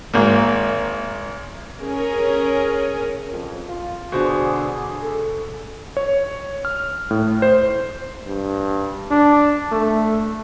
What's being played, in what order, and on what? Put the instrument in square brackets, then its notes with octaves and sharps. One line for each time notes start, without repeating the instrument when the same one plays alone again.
[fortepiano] G#1 A#3
[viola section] C#4 G#4 A#4
[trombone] F2
F4
[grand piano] B2 C5 [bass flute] D3 [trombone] G#4
[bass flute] A4
[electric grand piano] C#5
F6
A2
C5
[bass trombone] G2
D4
A3